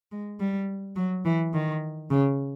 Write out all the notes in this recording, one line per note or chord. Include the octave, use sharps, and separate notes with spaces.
G#3
G3
F#3
E3
D#3
C#3